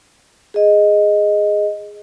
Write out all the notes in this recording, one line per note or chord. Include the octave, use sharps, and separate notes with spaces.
G#4 D#5